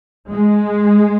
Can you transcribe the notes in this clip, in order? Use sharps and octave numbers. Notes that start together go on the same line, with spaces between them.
G#3